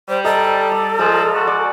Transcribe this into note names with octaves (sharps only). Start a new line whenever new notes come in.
G3 C5
A4 D#5 A#5
D5
F3 G#3
F#4
D5